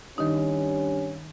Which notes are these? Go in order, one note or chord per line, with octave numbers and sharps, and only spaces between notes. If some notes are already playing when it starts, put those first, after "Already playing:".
G2 D#3 C#4 D#4